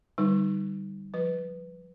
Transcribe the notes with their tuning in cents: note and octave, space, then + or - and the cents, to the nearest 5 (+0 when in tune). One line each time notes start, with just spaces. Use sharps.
D3 +0 G3 -10 D#4 +0
F3 +25 B4 +5